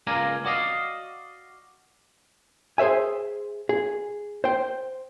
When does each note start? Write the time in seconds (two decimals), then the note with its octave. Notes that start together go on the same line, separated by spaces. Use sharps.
0.07 C#2 A#3 D5 F5 G#5 A#5
0.45 F#4 D5 D#5 F5
2.78 G#4 C5 C#5 E5 G#5
3.69 G#4
4.44 C5 G5